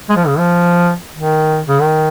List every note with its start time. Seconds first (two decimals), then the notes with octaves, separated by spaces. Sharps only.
0.09 G#3
0.16 F3
0.27 C#3
0.38 F3
1.15 D#3
1.68 C#3
1.80 D#3